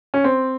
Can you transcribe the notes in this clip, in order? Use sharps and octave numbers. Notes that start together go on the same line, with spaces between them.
C#4
C4